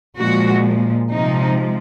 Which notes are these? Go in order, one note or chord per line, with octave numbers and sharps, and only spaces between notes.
A#2 F3 G#3 F#4
C3 F3 G#3 D#4